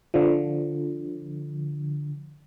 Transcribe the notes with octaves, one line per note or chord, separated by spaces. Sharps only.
D3 F3